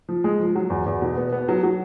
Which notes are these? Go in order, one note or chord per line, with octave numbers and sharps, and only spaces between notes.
F3
G#3
F3
F#3
E2
E2
B2
B3
B3
F#3
F#3